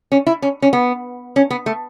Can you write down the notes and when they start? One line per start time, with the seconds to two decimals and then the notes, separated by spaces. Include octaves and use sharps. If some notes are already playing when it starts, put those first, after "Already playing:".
0.12 C#4
0.27 E4
0.42 C#4
0.62 C#4
0.73 B3
1.36 C#4
1.51 B3
1.66 A3